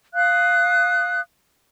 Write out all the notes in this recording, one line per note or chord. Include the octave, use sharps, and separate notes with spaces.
F5 D#6 F#6